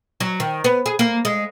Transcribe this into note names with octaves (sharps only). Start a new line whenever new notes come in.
F#3
D#3
B3
G#4
A#3
G#3